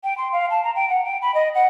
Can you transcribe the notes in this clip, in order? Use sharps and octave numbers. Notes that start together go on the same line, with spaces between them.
G5
C6
F5
A5
A#5
G5
F#5
G5
B5
D#5
F#5